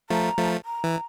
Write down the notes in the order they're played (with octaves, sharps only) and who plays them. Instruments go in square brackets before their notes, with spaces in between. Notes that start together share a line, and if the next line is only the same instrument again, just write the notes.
[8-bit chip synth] F3 A3 [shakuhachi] A#5
[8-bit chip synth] F3 A3
[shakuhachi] A#5
[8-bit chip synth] E3